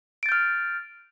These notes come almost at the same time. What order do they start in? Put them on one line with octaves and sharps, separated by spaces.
D7 A6 G6 F6